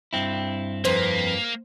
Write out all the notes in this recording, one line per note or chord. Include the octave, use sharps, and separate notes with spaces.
G2 C4 E4
F2 A#3 B4 C5